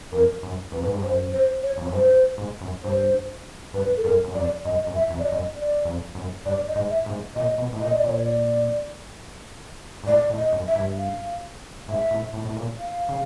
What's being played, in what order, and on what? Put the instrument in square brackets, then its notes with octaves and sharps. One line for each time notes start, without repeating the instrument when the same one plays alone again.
[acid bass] F2 [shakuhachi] A#4
[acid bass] F#2
[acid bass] F2 [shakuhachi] B4
[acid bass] G#2
G2
[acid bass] F#2 [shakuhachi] C5
[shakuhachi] C5
C#5
[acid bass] F2
F#2
[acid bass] G2 [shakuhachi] C5
[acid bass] G#2
F#2
[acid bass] G2 [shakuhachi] C5
[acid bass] G2 [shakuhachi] B4
[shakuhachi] A4
[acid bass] F#2 [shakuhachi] A#4
[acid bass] F#2
[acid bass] F2 [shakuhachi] D5
[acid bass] F#2 [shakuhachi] D#5
[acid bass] F#2
[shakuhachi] E5
[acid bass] F2
[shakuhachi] D5
D#5
[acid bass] F#2
[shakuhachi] D5
[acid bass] F2
F#2
[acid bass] G2 [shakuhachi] D5
[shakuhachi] D#5
[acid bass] G#2
[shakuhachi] E5
[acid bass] G#2
[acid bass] A#2 [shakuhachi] D#5
[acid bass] B2
A2
[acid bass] A#2 [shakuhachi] D#5
[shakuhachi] D5
[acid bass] A#2 [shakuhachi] C#5
[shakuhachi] D5
[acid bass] G#2
[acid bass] A2 [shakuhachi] D5
[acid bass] A2
[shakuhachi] D#5
[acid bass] F#2
[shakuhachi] E5
[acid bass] G2
[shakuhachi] F5
[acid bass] G#2 [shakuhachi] E5
[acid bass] A2
A2
A2
A#2
[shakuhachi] F5
[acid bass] C#3